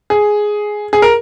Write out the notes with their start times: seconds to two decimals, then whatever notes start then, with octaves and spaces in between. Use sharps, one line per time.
0.10 G#4
0.93 G#4
1.02 A#4